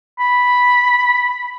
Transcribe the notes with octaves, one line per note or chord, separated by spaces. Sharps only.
B5